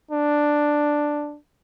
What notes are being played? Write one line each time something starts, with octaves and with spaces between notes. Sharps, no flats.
D4